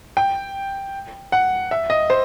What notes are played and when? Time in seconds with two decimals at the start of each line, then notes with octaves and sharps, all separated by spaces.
0.17 G5
1.32 F#5
1.71 E5
1.90 D#5
2.10 C5